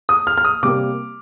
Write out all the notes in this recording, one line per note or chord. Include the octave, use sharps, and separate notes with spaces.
D#6
F6
F6
D#6
C3 G3 A#3 D6